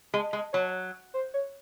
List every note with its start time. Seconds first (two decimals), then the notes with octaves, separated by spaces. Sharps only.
0.14 G#3
0.33 G#3
0.53 F#3 C#5
1.14 C5
1.34 C#5